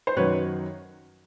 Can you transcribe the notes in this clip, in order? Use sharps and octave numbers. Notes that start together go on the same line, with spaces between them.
C5
F#2 D#3 F#3 B4 C#5